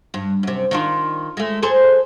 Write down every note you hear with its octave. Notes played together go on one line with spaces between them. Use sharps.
G2
F#2 C3
D#3 D4 F4
G#3 A3
G#4 A4 C5